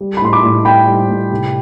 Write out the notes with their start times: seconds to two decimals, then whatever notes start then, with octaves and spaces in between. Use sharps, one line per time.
0.01 G3
0.17 B5
0.22 A2 C6
0.33 B5 D6
0.44 A2
0.65 C4 G5 B5
0.87 G3
1.09 A2
1.32 C3